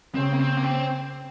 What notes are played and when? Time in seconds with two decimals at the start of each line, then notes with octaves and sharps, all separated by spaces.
0.14 C#3 C4
0.32 A#3
0.39 C4
0.57 A#3
0.63 C4